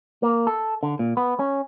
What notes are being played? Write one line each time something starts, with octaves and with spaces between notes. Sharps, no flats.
A#3
A4
D3
A#2
B3
C#4